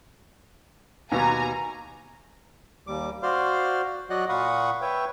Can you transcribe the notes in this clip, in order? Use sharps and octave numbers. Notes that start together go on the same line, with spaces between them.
D#2 B2 G#5 A#5
D#2 G3 D6
F#4 C5 D5 F5 C6 F6
F#3 F#4 D5 D#5 F#5 F#6
A#2 F5 F#5 B5 C#6 D#6
B4 C#5 E5 G5